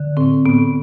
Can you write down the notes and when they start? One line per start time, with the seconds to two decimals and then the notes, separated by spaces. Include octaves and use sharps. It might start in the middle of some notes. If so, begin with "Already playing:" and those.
Already playing: D3
0.17 A2 C4
0.46 A2 B3